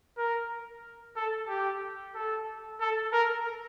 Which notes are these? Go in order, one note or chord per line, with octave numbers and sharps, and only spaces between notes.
A#4
A4
G4
A4
A4
A#4